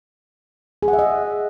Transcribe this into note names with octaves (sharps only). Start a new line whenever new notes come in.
G#4
F#5
E5
D#5